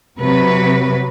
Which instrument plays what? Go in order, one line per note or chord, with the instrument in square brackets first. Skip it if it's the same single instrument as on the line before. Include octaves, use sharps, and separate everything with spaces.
[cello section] C3 F#3 B4